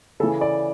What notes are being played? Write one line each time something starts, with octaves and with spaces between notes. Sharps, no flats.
C#3 E3 A4
D5